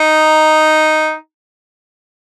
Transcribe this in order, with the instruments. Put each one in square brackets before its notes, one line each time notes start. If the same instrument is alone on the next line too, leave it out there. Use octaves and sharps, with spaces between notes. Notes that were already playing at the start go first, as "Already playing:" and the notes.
Already playing: [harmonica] D#4